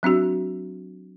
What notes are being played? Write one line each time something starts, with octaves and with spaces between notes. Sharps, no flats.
F#3 C4 D4 F#4